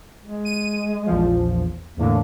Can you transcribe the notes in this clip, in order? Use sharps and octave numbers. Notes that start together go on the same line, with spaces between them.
G#3
D#7
A#1 E2 F3
E2 A2 D3 A#3